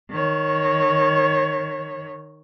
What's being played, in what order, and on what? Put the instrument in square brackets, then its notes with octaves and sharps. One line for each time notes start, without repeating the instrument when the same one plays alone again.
[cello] D#3 C#5